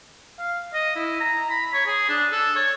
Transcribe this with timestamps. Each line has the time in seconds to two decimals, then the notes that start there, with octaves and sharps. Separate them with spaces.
0.39 F5
0.74 D#5
0.95 E4
1.20 A#5
1.50 B5
1.73 C#5
1.86 G#4
2.09 D4
2.32 A4
2.56 C#5